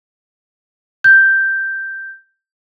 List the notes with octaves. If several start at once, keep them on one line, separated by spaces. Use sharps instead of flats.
G6